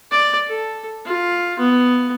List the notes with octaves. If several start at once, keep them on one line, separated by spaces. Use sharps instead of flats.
D5
A4
F4
B3